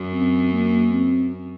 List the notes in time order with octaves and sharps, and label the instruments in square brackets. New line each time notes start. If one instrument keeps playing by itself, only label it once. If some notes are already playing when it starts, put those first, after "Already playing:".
Already playing: [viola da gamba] F#2
[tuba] C4
A#3
C4